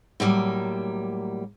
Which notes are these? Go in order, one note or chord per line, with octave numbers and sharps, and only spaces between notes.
A2 F#3 G3 A#3